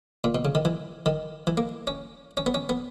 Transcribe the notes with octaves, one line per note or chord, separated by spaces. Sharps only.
A#2
B2
C#3
D#3
E3
D#3
E3
A#3
C#4
C#4
B3
C#4
B3